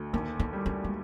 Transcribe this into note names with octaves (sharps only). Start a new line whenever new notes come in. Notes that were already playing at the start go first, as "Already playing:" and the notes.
Already playing: D2
D#2 D4
D#4
G3
D4
G#3